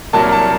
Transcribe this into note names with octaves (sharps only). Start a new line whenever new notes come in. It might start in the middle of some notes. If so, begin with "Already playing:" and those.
C2 A#2 F#3 A#3 A5
A5